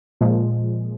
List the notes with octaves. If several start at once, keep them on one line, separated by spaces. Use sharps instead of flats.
A#2 F3 G#3